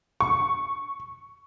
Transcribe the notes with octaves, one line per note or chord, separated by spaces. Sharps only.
C#6